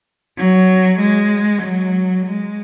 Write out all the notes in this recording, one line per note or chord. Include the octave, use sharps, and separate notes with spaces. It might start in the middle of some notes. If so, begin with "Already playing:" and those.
F#3
G#3
F#3
G#3